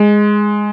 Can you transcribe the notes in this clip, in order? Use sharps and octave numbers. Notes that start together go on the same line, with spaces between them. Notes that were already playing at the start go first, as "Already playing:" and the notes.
Already playing: G#3